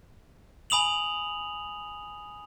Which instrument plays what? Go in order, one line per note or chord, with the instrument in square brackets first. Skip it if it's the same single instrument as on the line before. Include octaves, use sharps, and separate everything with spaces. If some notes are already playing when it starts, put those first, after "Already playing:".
[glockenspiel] G#5 B5 D#6 F7 F#7